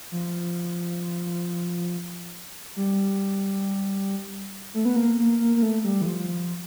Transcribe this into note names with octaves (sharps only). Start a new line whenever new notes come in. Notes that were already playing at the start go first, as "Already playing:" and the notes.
F3
G3
A3
B3
A#3
A#3
A#3
A#3
A3
G3
E3
F3